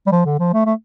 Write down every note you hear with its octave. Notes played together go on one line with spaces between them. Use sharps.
G3
F3
D3
F3
A3
A3